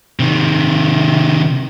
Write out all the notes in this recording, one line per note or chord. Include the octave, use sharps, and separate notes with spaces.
C3 D#3